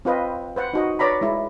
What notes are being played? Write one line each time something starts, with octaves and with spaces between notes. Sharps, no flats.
C4 F4 B4 D#5
B4 C5 F#5
D#4 F#4 D#5
B4 C#5 D5 A#5 B5
G#3 E4